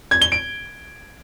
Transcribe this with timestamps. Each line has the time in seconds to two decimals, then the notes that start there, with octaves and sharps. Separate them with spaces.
0.11 G#6
0.22 G7
0.32 D7